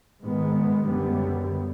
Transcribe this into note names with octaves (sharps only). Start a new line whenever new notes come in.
G#2 D#3 G#3 B3
F#2 D3 G3 B3